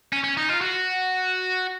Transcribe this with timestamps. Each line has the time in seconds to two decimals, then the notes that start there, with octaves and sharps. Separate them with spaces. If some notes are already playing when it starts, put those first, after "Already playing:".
0.13 C#4
0.24 C#4
0.37 D#4
0.49 F4
0.61 F#4